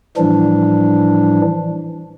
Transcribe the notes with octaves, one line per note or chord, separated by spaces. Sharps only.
A2 E3 F3 G3 D4